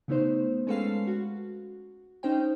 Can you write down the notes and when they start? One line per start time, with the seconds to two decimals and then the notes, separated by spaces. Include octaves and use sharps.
0.08 C#3 A3 B3 D#4 C5
0.67 G#3 C#4 A4 B4 F5 C7
1.07 F#4
2.23 C#4 D#4 C5 G5